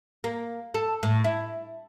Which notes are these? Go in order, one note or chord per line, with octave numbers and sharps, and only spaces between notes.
A#3
A4
A2
E4